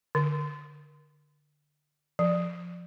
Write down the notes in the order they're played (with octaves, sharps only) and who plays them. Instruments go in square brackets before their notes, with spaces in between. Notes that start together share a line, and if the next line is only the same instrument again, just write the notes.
[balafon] D3
F3